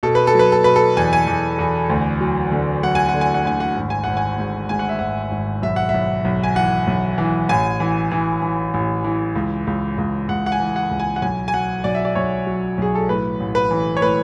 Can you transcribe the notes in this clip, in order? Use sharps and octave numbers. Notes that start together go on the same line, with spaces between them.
B2 A4
B4
A4
F#3 B4
A4
B2 B4
A4
E2 G#5
G#5
E2
E2
D2
F#3
D3
F#3 F#5
G#5
F#5
D3
G#5
F#5
D2 G#5
F#5
G#1
G#5
G#1 F#5
G#5
G#2
G#2 G#5
F#5
E5
G#1 F#5
G#1
B1 E5
F#5
B1 E5
B1
G#5
E3 F#5
B1
E3
A1 G#5
E3
E3
E3
A1
E3
C#2
C#2
C#2
C#2 F#5
F#5
G#5
E3
F#5
C#2
G#5
F#5
B1 G#5
G#5
F#3 F#5
B1 D5
E5
D5
B1 C#5
F#3
B1 G#4
A4
A2 B4
A1
B4
E3
C#5
A2 B4